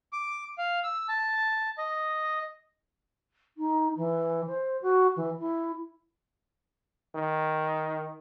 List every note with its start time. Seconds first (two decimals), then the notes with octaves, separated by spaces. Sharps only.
0.13 D6
0.58 F5
0.84 E6
1.09 A5
1.78 D#5
3.58 D#4
3.97 E3
4.47 C5
4.82 F#4
5.16 E3
5.39 E4
7.16 D#3